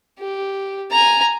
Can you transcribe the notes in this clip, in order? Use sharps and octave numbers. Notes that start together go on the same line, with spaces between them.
G4
G#5 A#5